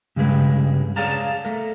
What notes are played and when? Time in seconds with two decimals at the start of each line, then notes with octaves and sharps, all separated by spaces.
0.16 G2 C#3 G#3 G#4 B4
0.96 G#4 C#5 D5 F5 A5 A#5
1.45 A3 A#4